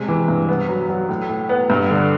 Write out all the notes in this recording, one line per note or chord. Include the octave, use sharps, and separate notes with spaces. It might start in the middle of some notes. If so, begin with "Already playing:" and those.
Already playing: C3 G#3
E3
G2
B3
F#3
F#3
A2
A2
B3
G2
D3